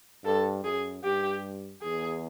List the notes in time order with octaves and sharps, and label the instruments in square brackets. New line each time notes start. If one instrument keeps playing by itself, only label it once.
[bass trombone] G2 [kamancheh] A4
[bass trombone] F#2 [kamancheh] G#4
[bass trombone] G2 [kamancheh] G4
[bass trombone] E2 [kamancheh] G#4